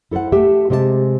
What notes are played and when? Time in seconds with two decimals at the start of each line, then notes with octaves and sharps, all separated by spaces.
0.11 E4 A4 B4 C5 F#5
0.32 A3 G4 E5
0.70 C3 G#3 G4 D5 A5